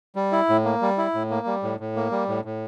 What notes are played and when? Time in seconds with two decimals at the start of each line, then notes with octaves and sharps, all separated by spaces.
0.16 G3
0.32 E4
0.49 A2
0.64 A#3
0.82 G3
0.98 E4
1.14 A2
1.30 A#3
1.47 G3
1.63 A2
1.80 A2
1.96 A#3
2.11 G3
2.28 A2
2.45 A2